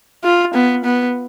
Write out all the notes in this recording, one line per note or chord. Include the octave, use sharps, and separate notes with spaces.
F4
B3
B3